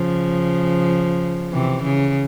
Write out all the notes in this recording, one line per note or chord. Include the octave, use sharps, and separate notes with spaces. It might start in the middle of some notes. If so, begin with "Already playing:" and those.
Already playing: C#3 F3
C3 E3
C#3